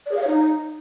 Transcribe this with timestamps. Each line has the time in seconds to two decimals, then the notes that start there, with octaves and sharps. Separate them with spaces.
0.06 D5
0.11 G#4
0.17 F5
0.22 C#5
0.27 D#4